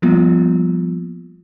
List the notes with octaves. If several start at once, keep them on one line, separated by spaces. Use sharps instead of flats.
F3 G3 A#3 B3 F4